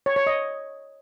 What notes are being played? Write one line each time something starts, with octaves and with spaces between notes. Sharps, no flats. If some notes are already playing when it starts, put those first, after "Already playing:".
C#5
C#5
D#5